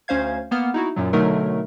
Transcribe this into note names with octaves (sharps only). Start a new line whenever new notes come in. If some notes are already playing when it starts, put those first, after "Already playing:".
D2 C#4 C5 F5 G#6
A#3 B3 F6
D#4 E4 F#4
F#2 A#2 F#3
B2 D3 F#3 A3 D#4 A#4